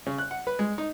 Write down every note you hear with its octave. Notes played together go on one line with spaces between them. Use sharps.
C#3
F#6
F#5
B4
G#3
D#4